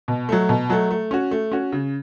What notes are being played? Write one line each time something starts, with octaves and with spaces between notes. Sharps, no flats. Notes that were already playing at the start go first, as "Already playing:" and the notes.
B2
F#3 A3
B2
F#3 A3
A3
C#4 F#4
A3
C#4 F#4
C#3